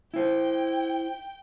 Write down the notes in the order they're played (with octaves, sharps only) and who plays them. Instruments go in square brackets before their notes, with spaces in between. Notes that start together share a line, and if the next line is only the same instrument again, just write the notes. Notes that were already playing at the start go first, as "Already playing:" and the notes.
[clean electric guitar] E4 C5 [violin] G5